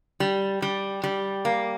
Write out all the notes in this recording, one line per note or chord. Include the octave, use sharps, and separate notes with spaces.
G3
G3
G3
A#3